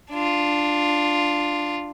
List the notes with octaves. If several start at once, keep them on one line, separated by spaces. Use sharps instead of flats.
D4 F4